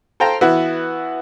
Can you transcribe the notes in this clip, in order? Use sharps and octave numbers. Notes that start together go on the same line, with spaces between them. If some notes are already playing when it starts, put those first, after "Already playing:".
A4 C5 F5 G5 A#5
E3 B3 E4 F#4